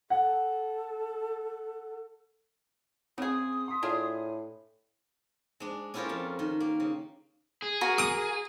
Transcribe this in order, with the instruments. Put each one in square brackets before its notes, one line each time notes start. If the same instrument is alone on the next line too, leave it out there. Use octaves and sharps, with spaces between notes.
[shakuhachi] A4 [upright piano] F#5
[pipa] C#3 G#4 [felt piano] C4 [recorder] D#6
[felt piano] C6 B6
[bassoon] A2 [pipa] D4 F4 G#4
[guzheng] G#3 D4
C#4 E4 F4 G4 A4 A#4
F2
D#3
A#3
C#3
[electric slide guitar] G#4
[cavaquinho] F#4 A#4
[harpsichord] D#6